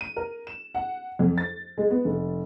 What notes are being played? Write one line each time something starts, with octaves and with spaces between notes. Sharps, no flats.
D#7
A#4
E7
F#5
F2
A6
G#3
B3
F1